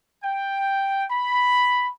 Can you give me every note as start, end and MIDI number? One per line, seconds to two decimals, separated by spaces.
0.24 1.05 79
1.11 1.89 83